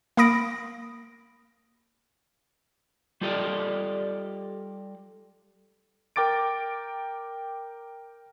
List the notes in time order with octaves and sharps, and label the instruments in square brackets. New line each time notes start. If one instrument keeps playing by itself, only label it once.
[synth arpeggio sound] A#3 F5 B5 D#6 A#6 D7
[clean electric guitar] G3 F4 G4 A4 D5 D#5
[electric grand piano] A#4 G5 D6 A6 D7